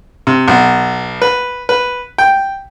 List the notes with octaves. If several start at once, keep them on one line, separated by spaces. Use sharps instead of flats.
C3
B1
B4
B4
G5